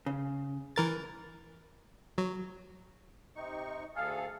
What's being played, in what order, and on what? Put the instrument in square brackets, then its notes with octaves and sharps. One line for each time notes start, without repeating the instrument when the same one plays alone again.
[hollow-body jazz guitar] C#3
[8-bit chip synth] E3 A#4 A6
F#3
[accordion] C3 D#4 C#6
[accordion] D2 G#4 A4 [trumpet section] F5